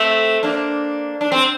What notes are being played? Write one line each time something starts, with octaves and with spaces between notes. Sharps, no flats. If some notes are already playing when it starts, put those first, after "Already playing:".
Already playing: A3 C4
A#3 D4
D4
C4